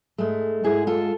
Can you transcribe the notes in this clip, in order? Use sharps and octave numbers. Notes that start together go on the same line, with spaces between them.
G#2 G#3 A3
G#2 G#3 E4 G#4
F4 A4